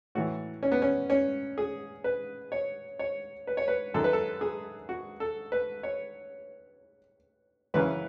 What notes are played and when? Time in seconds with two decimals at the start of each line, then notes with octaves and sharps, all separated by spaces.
0.15 A2 E3 F#4
0.63 C#4
0.72 B3
0.82 C#4
1.10 C#4
1.58 G#4
2.04 B4
2.52 C#5
2.99 C#5
3.47 B4
3.57 C#5
3.68 B4
3.94 F#2 D#3 A4
4.04 B4
4.13 A4
4.41 G#4
4.89 F#4
5.20 A4
5.52 B4
5.83 C#5
7.74 F#2 C#3 E3 B4